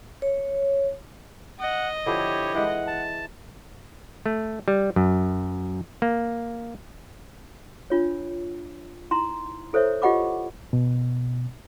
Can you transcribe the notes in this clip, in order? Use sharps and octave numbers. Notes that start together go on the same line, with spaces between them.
C#5
D#5 F#5
D3 F3 E4 G4 C#5
E3 G#3 F#5
A5
A3
G3
F#2
A#3
D4 F4 C#5
D#4 E4 A#5 C6
E4 A4 C5 C#5 E5
F4 G4 D#5 F#5 B5 D6
B2